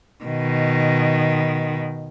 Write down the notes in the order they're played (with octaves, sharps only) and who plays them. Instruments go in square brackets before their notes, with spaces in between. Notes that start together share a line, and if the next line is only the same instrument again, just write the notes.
[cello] B2 D#3